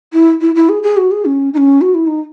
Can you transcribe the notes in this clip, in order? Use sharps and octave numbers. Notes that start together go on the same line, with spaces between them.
E4
E4
E4
G#4
G#4
F#4
G#4
C#4
D#4
C#4
F#4
E4
D#4